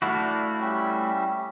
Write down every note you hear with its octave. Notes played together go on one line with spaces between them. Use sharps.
A3 D4 E4 F#4 F5
G3 C#4 E5